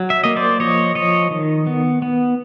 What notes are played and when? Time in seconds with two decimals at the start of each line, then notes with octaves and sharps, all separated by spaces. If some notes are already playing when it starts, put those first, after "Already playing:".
Already playing: F#3
0.10 E5
0.24 A#3 D#5
0.36 C5 D5
0.60 F3 C#5 D#5
0.95 F3 C#5 D#5
1.31 D#3
1.67 B3
2.02 B3